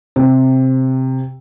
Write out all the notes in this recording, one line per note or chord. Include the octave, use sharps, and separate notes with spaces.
C3